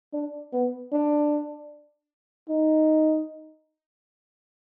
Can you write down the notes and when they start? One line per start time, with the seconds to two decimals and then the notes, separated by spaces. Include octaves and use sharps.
0.14 D4
0.53 B3
0.92 D4
2.49 D#4